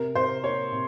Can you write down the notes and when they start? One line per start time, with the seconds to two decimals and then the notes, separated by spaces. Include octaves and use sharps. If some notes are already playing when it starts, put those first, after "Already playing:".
Already playing: C3 A#4
0.15 C3 C5
0.44 A#3 C#5
0.72 C3